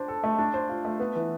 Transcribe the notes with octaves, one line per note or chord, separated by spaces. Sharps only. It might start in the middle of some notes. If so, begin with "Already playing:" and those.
Already playing: D4 C5
A4
A3
D4
C5
F4
A3
B3
E3